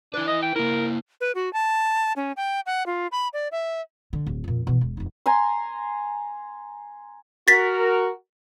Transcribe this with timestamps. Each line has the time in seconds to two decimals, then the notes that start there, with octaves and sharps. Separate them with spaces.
0.14 D4 E4 B4
0.28 D#5
0.42 G5
0.56 A#3 E4 A#4
1.21 B4
1.35 F#4
1.53 A5
2.16 C#4
2.37 G5
2.66 F#5
2.86 F4
3.12 B5
3.33 D5
3.52 E5
4.13 D3
4.26 D1
4.44 F2 A#2
4.67 B2 E3
4.81 E1
4.97 F1 D#4
5.26 G#5 A#5 C6
7.48 F#4 A#4 A6 B6